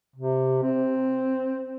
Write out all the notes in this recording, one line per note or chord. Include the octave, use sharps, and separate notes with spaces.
C3
C4